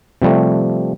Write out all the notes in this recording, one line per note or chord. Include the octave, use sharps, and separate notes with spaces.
C3 F3 G3 A3